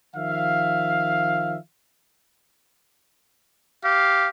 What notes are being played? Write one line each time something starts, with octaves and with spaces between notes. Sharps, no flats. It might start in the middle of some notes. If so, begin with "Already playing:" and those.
D#3 F3 E5 F5
G4 F5